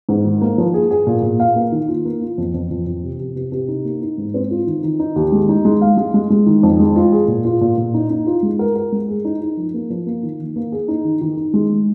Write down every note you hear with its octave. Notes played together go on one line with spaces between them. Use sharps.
G#2
D#3
A#3
F3
G#4
G#4
A#2
A#2
F5
A#3
D#3
F4
A#3
F4
F2
F2
F2
F2
C3
C3
C3
C3
D#4
A#3
D#4
G#2
C4
F4
D#3
D#3
D#4
D#2
G#3
D#4
G#3
F5
G#3
G#3
G#3
D#3
F2
G#3
F4
G#4
A#2
F4
A#2
A#2
D#4
D#4
F4
G#3
A#4
A#4
G#3
G#4
D#4
D#4
F3
A#3
F3
A#3
D#3
D#3
A#3
G#4
D#4
D#3
D#3
D#3
G#3